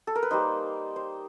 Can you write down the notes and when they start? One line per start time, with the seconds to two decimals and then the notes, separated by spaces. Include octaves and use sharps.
0.07 A4
0.15 A#4
0.23 B4
0.31 G3 A#3 D#4 C5
0.96 C5